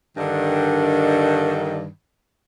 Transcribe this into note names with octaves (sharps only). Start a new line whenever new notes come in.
G2 D3 D#3